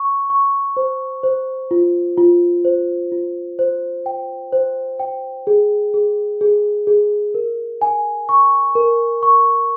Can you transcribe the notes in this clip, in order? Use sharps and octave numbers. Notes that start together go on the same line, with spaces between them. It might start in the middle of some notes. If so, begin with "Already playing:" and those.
Already playing: C#6
C#6
C5
C5
F4
F4
C5
F4
C5
G5
C5
G5
G#4
G#4
G#4
G#4
A#4
G#5
C#6
A#4
C#6